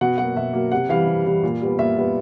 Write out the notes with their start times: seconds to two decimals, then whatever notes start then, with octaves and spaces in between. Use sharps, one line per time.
0.01 B2 F#5
0.18 F#3 A#3 F#5
0.36 B2 E5
0.53 F#3 A#3
0.72 C3 F#5
0.89 E3 G3 F5
1.07 C3
1.26 E3 G3
1.43 A#2
1.62 G3 B3
1.79 A#2 E5
1.97 G3 B3